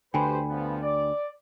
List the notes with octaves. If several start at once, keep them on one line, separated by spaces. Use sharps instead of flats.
D2 D3 G4 B4 C5 G5 G#5 B5
G2 F3 B3
D5